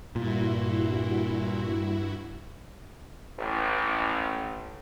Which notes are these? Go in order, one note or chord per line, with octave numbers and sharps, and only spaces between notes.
G2 A#2 E4 F#4
A1